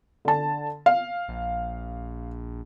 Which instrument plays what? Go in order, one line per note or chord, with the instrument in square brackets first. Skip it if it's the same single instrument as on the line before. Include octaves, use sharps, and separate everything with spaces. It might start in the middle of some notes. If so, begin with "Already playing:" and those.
[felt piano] D3 A5
F5
[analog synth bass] A#1